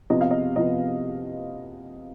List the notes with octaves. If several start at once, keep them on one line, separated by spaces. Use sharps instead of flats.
C3 F3 B3 D#5
F5
D#5
C3 F3 B3 D#5